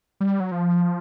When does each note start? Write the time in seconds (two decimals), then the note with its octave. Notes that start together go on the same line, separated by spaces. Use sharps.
0.20 G3
0.40 F#3
0.52 F3